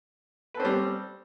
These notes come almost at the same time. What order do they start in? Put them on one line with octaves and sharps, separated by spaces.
B4 A4 C4 C#4 G3